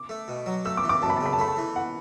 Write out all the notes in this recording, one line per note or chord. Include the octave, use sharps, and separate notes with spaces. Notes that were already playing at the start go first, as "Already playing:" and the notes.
Already playing: D6
A3
B2
F#3
A3 E6
D6
E3
D6
F#2 A5
B5
A5
C#3 B5
A5
A3 B5
A5
E3
F#5